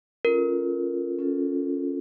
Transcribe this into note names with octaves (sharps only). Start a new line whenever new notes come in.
C#4 F4 A4 A#4
C#4 F4 A4